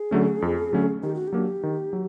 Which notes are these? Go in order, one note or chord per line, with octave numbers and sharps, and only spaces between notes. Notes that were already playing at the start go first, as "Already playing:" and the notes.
Already playing: G#4
D3 F#3 A3 C#4
F2
D3 F#3 A3 C#4
D#3 G4
F#4
G4
F#3 A#3 D4
D#3
F#3